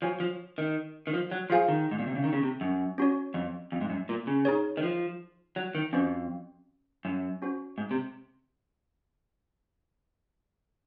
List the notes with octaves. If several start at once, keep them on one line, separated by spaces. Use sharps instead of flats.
F3 F#4 C#5 G#5
F3
D#3
D#3
F3
F#3
F3 F4 G#4 C5 F5 G#5
D#3
G#2
A#2
C3
C#3
D#3
C#3
C3
F#2
C#4 F#4 C#5
F2
F2
G#2
F#2
A#2
C#3
D#4 G#4 C#5
D#3
F3
F#3
D#3
F2 C#4 F#4 C5
F#2
C#4 F#4 C5
G#2
C3